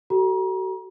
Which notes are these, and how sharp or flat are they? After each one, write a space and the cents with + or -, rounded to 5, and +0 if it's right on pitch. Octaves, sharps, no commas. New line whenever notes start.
F#4 +35 A4 +0 A#5 +35